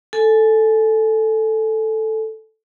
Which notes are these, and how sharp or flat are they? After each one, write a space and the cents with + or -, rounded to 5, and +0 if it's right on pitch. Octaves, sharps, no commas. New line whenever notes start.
A4 +0 G#5 +25